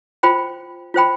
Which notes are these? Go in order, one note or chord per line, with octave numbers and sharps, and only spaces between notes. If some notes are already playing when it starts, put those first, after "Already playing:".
F4 C5 G5 B5
F4 C5 G5 B5